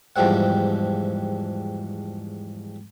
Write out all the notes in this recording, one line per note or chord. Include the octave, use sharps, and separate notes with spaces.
E2 G#2 F3 G3 C4 F#5